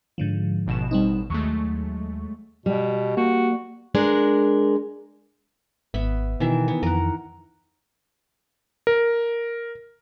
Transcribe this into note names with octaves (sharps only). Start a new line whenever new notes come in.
G#2 D3 F3
A1 B2 E7
G3 C4 D#4
D#2 F#3 G#3 A3 C#6
B2 G3
A#3 F#4
G#3 D4 A#4
G#1 B3 E5 B5
B2 D#3 E3 E5
B3
F2 A#4 F#5
A#4